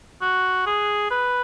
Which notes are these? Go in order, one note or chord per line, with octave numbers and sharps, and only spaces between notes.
F#4
G#4
B4